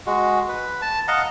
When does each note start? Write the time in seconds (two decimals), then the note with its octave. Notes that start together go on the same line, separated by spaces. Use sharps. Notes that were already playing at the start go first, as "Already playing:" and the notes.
0.07 G#3 F#4
0.48 B4
0.82 A5
1.08 D#5 F5 F#5 A#5